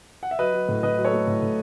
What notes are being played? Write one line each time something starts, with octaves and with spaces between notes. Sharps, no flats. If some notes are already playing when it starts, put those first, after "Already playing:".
F#5
E5
F#3 B4 D#5
F#3
A2
A2 B4 D#5
F#3
A4 C#5
A3
A2
A2